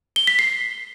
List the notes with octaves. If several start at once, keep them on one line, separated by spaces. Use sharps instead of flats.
G7
B6
C7